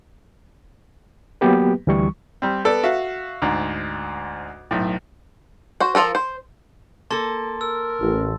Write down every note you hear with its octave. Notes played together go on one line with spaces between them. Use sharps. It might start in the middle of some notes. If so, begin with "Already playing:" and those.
F#3 A#3 B3 G4 B4
D2 E3 G3 C#6
G3 C4
B3 A4 D5
F#4 E5 F5
D2 G#2
B1 A2
F#4 C5
F3 F4 A4 A#4
C5
A#3 A4 A5 C6 A6
A#4 E6
A1